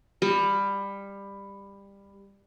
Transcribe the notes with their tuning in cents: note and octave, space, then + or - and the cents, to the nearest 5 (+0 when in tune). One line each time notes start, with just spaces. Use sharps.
G3 +20